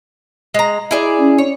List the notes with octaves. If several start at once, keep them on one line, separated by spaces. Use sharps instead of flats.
G#3 A#5
E4 G#4 D5
C#4
C#5